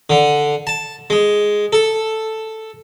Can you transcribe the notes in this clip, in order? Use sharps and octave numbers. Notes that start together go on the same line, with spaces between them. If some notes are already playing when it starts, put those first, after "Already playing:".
D3
A5
G#3
A4